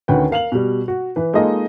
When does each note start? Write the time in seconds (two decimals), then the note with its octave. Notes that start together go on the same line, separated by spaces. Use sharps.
0.08 D2 D#3 C#4 B4 F#5 G5
0.31 A#4 F5 F7 F#7
0.52 B2 G3
0.88 F#4
1.16 E3 B4
1.34 G#3 A#3 D#4 F4 A4 D#5